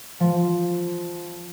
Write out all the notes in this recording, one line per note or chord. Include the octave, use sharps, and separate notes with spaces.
F3